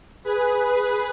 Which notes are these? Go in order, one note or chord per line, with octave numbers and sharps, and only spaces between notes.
G#4 B4
G#4 B4